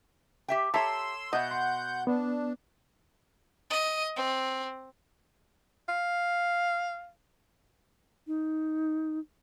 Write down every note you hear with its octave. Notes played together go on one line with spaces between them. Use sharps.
G4 E5 G5
G4 A4 C#5 E5 A#5 C6 E6
B2 D#5 E5 F#5 G6
C6
B3 D4
D#5
C4
F5
D#4